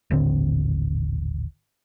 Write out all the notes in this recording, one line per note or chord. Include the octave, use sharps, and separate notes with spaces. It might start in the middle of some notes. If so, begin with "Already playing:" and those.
D#1 A1 D3 C4